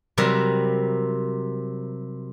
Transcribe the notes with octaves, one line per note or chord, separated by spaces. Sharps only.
C3 F#3 G3 A#4 E5